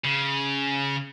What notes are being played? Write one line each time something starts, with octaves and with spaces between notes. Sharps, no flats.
C#3